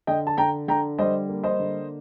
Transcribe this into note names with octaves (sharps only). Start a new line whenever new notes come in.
D3 D#5 G5
A5
D3 G5 A#5
D3 G5 A#5
G3 C5 D#5
A#3
C5 D#5
D3